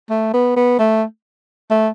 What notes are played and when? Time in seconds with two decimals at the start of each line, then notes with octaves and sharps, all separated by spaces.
0.10 A3
0.34 B3
0.57 B3
0.79 A3
1.70 A3